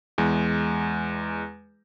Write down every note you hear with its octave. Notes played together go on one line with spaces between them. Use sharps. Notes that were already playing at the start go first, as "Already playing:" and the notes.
E2 G#3